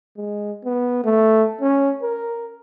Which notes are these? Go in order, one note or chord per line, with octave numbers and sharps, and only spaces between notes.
G#3
B3
A3
C#4
A#4